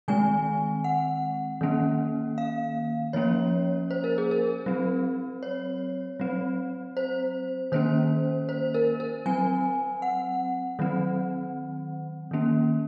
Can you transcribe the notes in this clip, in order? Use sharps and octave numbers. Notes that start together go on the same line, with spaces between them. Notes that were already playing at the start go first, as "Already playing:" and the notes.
D#3 G#3 C4 G#5
F#5
D#3 A#3 C#4
F5
F3 A#3 C#4 C#5
C5
A#4
G#4
A#4
F#3 C4
C#5
F#3 C4
C5
D#3 A#3 C#4 C5
C5
A#4
A#4
F#3 C4 G#5
F#5
D#3 F#3 C4
D#3 A#3 C#4